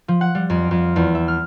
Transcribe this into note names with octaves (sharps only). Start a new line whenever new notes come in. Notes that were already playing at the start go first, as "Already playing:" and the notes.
F3
F#5
G3
F2
F2
E2
E5
F6